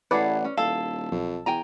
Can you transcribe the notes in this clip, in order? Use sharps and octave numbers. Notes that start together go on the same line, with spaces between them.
A1 E4 G#4 A4 B4 D5 F#5
C#4
D#1 E4 A4 F5
B1 F2
E2 G5 G#5 A#5